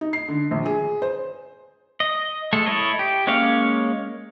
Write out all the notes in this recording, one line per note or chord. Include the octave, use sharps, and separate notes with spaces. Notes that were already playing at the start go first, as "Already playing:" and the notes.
D#4
C7
D3
A#1
G#4
C5
D#5
G#3 A3 A4
E4 A4 C#5 D#5
G4
G#3 A#3 C#4 C#5 F5